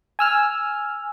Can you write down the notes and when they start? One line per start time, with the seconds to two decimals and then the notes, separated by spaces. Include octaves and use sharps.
0.19 G#5 E6 F6